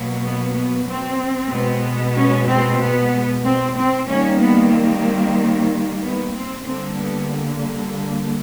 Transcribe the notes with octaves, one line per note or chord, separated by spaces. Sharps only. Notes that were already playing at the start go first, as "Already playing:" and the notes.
Already playing: B2 F#3 A#3
B3
B3
C4
B2 G#3 B3
C#4
C4
B3
C4
C4
D#3 G3 A#3 C#4
B3
C4
B3
C4
D3 G3 A#3 C4
B3